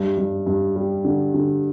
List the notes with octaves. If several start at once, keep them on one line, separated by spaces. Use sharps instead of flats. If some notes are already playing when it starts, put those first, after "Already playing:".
Already playing: G2
G2
G2
G3
D3
D3